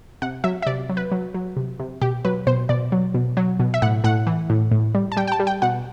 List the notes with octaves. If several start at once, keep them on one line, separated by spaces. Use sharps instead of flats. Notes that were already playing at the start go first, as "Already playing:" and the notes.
C3 F#5
F#3 E5
E5
C3 D5
F#3
B4
F#3
F#3
C3
C3
B2 G4
F#3 B4
B2 C5
B2 D5
F#3
B2
F#3
B2
E5
A2 F#5
A2 F#5
E3
A2
A2
G3
A5
G3 G5
G5
A5
G3
G5
B2 F#5